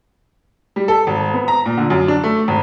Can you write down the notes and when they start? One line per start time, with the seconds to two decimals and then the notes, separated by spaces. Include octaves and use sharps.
0.76 G3
0.88 A4
1.07 G#1
1.34 B3
1.48 A#5
1.66 A#2
1.78 D3
1.90 F#2
2.08 D4
2.24 A3
2.48 G#1